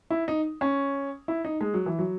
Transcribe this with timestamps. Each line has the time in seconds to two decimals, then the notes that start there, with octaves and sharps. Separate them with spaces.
0.10 E4
0.28 D#4
0.61 C#4
1.28 E4
1.45 D#4
1.61 G#3
1.74 F#3
1.86 E3
1.99 F#3